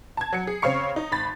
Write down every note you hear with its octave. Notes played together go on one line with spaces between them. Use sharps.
A5 G#6
F#3 C#7
G#4
C#3 C4 C#5 F5 C#6 C#7
D#4
G#1 B5 A6